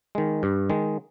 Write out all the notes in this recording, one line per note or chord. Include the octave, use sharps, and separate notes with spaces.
D#3 G#3
G2
D#3 G#3